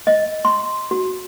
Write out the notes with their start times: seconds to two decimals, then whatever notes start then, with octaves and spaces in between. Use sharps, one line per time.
0.07 D#5
0.45 C6
0.91 F#4